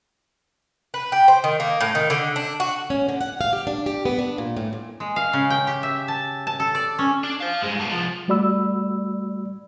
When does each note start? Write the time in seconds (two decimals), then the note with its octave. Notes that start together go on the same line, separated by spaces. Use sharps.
0.94 B4
1.12 G4
1.28 C5
1.44 D#3
1.60 A#3
1.81 A2
1.95 D#3
2.10 D3
2.36 D4
2.60 F#4
2.90 C#4
3.09 D3
3.21 F#5
3.41 F5
3.53 G4
3.67 D4
3.86 G4
4.05 B3
4.19 D4
4.38 A#2
4.57 A2
4.73 A#2
5.00 G#3
5.16 F5
5.33 C#3
5.50 G5
5.67 G4
5.83 E5
6.08 A5
6.47 A5
6.60 A4
6.75 D5
6.99 C#4
7.23 D4
7.40 C5 F5
7.62 G2 G#3
7.80 B3 A4
7.92 C2 F3
8.28 G3 A3 F#4 D5 B5 E6